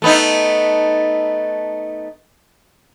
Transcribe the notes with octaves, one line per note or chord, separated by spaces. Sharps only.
A3 B3 D#4